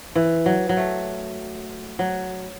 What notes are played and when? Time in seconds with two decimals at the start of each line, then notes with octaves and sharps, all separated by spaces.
0.16 E3
0.46 F#3
0.69 F#3
0.77 A3
1.99 F#3